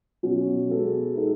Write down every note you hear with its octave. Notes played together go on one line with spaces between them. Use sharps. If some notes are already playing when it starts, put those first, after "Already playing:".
B2 F#3 C#4
G#3 B3 F#4 A4
G#3 D#4 A4